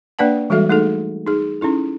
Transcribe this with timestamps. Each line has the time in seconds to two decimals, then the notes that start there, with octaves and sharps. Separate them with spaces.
0.19 A#3 D4 B4 D5 F#5 A5
0.50 E3 G3 G#3 F#4 A4 E5
0.69 A3 D#4 G#4 A4
1.27 D#4 G#4
1.61 C#4 D#4 E4 A4